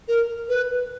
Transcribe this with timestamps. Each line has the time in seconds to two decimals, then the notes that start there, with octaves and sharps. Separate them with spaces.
0.08 A#4
0.49 B4